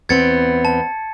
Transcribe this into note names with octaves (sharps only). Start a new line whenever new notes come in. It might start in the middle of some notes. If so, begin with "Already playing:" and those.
E2 B3 C4 G#6 A6 C#7
A5